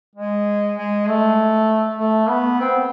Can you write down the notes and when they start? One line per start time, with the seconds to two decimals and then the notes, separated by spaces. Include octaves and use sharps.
0.16 G#3
0.77 G#3
1.08 A3
1.99 A3
2.29 B3
2.60 C4